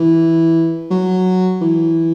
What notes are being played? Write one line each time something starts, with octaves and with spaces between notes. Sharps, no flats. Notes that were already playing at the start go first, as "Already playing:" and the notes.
Already playing: E3
F#3
E3